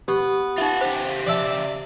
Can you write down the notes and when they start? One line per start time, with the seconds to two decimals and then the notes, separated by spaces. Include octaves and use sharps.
0.08 B3 G4 C#6
0.58 D#4 F4 E5 F#5
0.81 C#3 G4 C5
1.27 D5 E5 A5